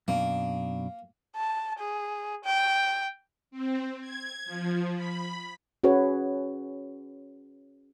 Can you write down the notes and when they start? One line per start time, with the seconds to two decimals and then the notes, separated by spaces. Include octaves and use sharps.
0.08 F#2 B2 A#3 D4
1.36 A5
1.79 G#4
2.45 G5
3.51 C4
4.01 G#6
4.45 F3
4.96 B5
5.84 C#4 F#4 G#4 B4 C#5